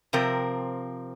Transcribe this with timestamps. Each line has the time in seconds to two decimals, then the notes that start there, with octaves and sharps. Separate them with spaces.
0.13 C3 F3 C4 A#4